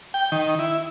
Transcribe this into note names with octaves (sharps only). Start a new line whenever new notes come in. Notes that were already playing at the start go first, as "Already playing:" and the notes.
G5
D#3
E4